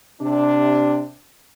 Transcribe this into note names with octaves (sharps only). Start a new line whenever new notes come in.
C3 D4